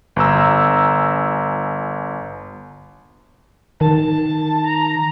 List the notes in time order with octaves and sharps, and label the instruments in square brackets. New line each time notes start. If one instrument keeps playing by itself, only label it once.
[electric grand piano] G1 A#5 E6
[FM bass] D#3 [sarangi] A5
[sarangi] A#5